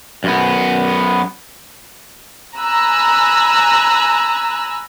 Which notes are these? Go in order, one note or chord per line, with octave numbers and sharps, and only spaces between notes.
F#2 B3
G#5 A#5 B5 E6 F#6